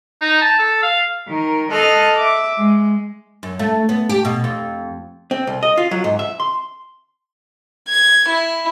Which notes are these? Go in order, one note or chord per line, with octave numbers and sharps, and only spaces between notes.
D#4
A5
A4
F5
D#3 A#4
A4 D#5 A5 C6 F6 F#6
E5 D6
G#3
F#2
A3
B3
G4
B2
F2
C4
C2
D#5
F4
F#3
G#2
E5
C6
G#6
E4